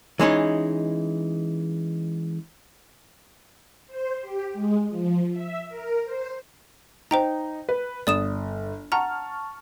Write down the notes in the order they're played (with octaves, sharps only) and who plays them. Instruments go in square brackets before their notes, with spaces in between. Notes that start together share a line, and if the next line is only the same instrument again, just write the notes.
[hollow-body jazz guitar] E3 G#3 C#4 D#4
[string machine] C5
G4
G#3
F3
E5
A#4
C5
[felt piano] D#4 [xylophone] C5 G5 A#5
[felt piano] B4
[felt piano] G1 [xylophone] D5 D#6 E7
[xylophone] F#5 A#5 [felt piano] A5 C#6 F6